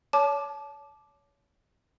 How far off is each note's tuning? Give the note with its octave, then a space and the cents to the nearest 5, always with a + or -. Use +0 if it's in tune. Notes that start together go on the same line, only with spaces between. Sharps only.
C#5 +30 A5 -25 D6 +10